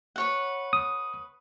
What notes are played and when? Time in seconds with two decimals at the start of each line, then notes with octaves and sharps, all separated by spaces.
0.16 B4 C#5 F#5
0.73 D#6